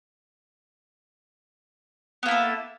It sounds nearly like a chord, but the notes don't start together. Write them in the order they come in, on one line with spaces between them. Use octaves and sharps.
B3 A#3 E4 A4